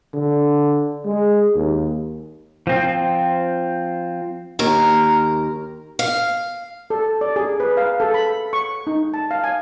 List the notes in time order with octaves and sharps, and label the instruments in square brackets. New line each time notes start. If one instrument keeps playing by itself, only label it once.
[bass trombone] D3
G#3
D#2
[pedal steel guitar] F3 C4
[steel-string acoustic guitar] D#2 A#4
F5
[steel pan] A4
D5
G#4
B4
F5
A4
B5
C#6
D#4
A5
F5
G#5